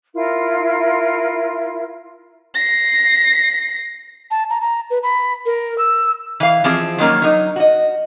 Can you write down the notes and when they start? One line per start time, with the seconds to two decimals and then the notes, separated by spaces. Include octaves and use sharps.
0.13 E4 F4 A#4
2.54 A#6 C7
4.31 A5
4.50 A#5
4.61 A#5
4.90 B4
5.03 B5
5.46 A#4
5.78 E6
6.40 E3 F5
6.64 E3 F3 C4 G#4
6.98 D#3 F#3 A#3 C#4
7.22 F#3 D#4
7.56 F#4 D#5